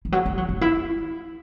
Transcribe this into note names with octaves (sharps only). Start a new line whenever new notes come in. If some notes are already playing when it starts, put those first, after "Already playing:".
E3
F#3
A3
F#3
C#4
E4